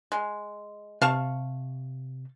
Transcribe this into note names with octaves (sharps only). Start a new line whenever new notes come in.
G#3
C3 F5 A5 C#6